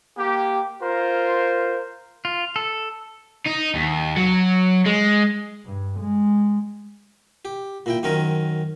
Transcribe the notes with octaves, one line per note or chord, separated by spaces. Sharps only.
A#3 G4
F4 A#4 C5
F4
A4
D#4
D#2
F#3
G#3
G2
G#3
G4
A#2 E4 G5
F#2 D#3 C4 C#4 A#4